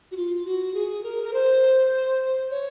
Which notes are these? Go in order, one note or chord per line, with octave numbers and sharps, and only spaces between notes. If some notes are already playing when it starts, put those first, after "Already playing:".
F#4
F4
F#4
G#4
A#4
A#4
C5
C#5